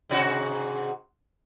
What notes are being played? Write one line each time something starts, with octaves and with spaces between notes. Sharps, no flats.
G#2 C3 F#4